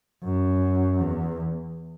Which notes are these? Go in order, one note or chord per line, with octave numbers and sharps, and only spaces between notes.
F#2
E2